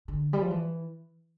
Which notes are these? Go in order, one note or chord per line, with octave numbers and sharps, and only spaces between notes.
D3
G3
F3
E3